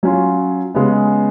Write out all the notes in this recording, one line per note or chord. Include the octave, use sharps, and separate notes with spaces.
F#3 C#4 F4
C#3 G#3 B3